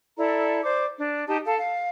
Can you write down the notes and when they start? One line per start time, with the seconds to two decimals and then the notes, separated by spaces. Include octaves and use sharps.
0.17 E4 A4 D5 A#5
0.64 C5 D5 D6
0.99 D4
1.28 D#4 G4 A5
1.45 A4 F5 A5
1.58 F5